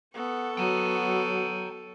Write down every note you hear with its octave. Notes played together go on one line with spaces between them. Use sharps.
B3 A4 C#6
F#3 B3 G5 A#5